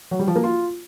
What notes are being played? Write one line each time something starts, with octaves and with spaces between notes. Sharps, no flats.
F#3
G3
F3
A#3
F4